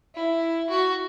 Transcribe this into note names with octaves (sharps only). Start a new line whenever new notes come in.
E4
F#4